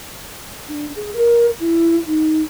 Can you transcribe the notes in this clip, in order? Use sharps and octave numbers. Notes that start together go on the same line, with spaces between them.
D4
G#4
A#4
E4
D#4